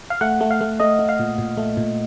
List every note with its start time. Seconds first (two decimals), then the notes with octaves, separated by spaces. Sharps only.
0.10 F5
0.21 A3 F#5
0.41 A3
0.51 F5
0.61 A3
0.80 A3 D#5
0.99 A3
1.09 F5
1.19 A#2
1.38 A#2
1.57 A3
1.77 A#2